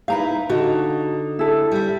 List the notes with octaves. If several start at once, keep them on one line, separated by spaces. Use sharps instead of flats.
D#4 E4 B4 F5 A#5
D3 D#4 F#4 D#5
E4 A4
G3 E5